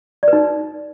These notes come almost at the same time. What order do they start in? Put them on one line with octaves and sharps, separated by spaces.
D5 B4 D#4